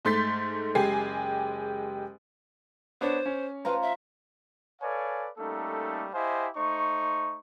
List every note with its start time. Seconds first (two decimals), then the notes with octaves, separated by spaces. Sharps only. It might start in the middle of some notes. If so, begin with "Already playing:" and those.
0.05 G#2 A3 C6 G6 A6 B6
0.75 F#1 G#3 G4 G#5 C7
3.01 B3 D4 C5 C#5
3.26 C#4
3.65 F4 B4 C5 A#5
3.82 E5
4.82 A4 B4 C#5 D5 F5 G#5
5.38 G3 A3 A#3 C#4 D#4 A4
6.14 E4 G4 C5 D#5 F5 G#5
6.55 A3 D#4 C5 C#6